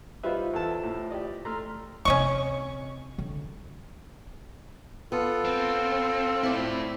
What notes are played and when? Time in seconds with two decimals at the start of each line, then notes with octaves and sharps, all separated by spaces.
0.23 G3 D#4 F4 B4 C5 E5
0.54 E2 A4 A5
0.83 A2
1.10 G4 D5 D#5
1.45 A3 A#5 C6 F6
2.05 C3 C4 C#4 D#5 C#6
3.18 D3
5.12 B3 F4 A4
5.45 C4
6.43 A3 C4 E4 D5